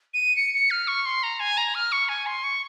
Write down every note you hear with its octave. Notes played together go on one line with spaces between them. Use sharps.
D#7
C#7
C#7
F6
C#6
C6
A#5
G#5
A#5
F6
C#6
G#5
C6
C#6